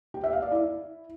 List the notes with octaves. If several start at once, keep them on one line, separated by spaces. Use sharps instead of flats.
G4
E5
F5
D5
E4